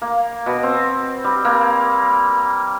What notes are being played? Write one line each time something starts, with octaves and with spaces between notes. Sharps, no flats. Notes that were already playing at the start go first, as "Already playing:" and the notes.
A#3
B2
C4
G3
A#3